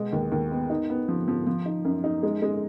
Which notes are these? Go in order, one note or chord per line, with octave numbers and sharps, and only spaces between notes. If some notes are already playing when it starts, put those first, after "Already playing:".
Already playing: B2 G#3
D#2
D#2
B3
D#4
B3
F3
F3
F3
D#4
F#2
D#4
G#3
G#3